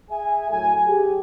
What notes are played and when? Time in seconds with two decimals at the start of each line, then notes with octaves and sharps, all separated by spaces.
0.10 G#4 E5 G#5
0.50 F#2 A2 F#3 A4 G#5
0.86 G4 G#4